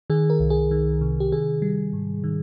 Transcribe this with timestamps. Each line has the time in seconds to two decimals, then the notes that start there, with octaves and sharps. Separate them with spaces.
0.10 D#3 G#4
0.30 A#4
0.40 C2
0.50 G#4
0.71 D#3
1.01 C3
1.20 G4
1.32 D#3 G#4
1.62 G3
1.93 G#2
2.24 D#3